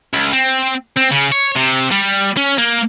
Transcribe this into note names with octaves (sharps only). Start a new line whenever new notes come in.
C#2
C4
C4
C#3
C#5
C3
G3
C#4
A#3